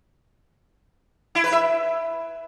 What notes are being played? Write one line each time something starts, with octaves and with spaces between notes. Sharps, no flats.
E4
B4
E5